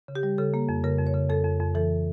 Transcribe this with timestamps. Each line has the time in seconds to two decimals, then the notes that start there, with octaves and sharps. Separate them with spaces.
0.08 C#3
0.15 G4
0.23 G3
0.38 C#3 A4
0.54 A#3
0.69 F2
0.84 C#3 A#4
0.99 F2
1.07 C#5
1.14 C#3
1.30 F2 A4
1.45 F2
1.60 F2
1.75 E3 A4